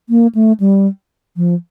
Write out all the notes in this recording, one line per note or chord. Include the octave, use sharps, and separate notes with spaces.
A#3
A3
G3
F3